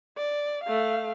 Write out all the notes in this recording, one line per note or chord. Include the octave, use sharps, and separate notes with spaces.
D5
A3 F5